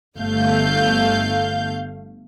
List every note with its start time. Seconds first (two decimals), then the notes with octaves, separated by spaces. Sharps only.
0.17 G1 A3 F5 G6